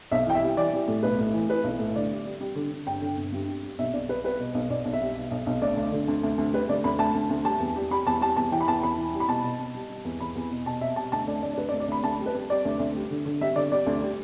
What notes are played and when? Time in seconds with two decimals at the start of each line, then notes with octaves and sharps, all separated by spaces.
0.11 B1 E5
0.27 E3 G5
0.35 E5
0.42 G3
0.57 E3 D5
0.73 G3
0.88 A2
1.03 B1 B4
1.19 A2
1.34 E3
1.49 E3 B4
1.64 B1
1.79 A2
1.96 D3 D5
2.11 G3
2.25 G3
2.41 G3
2.56 D3
2.71 D3
2.87 G1 G5
3.02 D3
3.17 G1
3.32 G2
3.48 G3
3.63 G3
3.78 B1 E5
3.93 B1 D5
4.09 G3 B4
4.24 G3 B4
4.40 B2
4.54 B1
4.70 B1 D5
4.85 B1
4.93 E5
5.01 G3
5.17 B2
5.31 B1
5.46 B1
5.62 D2 D5
5.77 D2
5.92 D3
6.08 D2
6.23 D2
6.38 D2
6.54 G3 B4
6.69 D2 D5
6.84 D2 B5
6.99 D2 A5
7.15 D2
7.30 D2
7.45 G3 A5
7.60 E2
7.76 G3
7.91 G3 B5
8.07 E2 A5
8.21 G3 A5
8.37 E2 A5
8.52 E3 G5
8.61 B5
8.68 E2 A5
8.83 E2 B5
8.98 E3
9.14 G3
9.20 B5
9.28 B2 A5
9.43 B2
9.59 B2
9.75 G3
9.90 G3
10.05 E2
10.20 E2 B5
10.36 E2
10.51 B2
10.66 B2 A5
10.81 B2 E5
10.96 G3 A5
11.12 D2 A5
11.27 D2 D5
11.42 D2 D5
11.53 D5
11.57 D2 B4
11.69 D5
11.73 D2
11.80 D5
11.88 D2 B5
12.03 D2 A5
12.19 G3
12.26 B4
12.34 G3
12.50 G3 D5
12.65 D2
12.80 D2
12.95 G3
13.11 D3
13.25 D3
13.41 G3 E5
13.56 D3 D5
13.72 G3 D5
13.87 D2
14.02 G3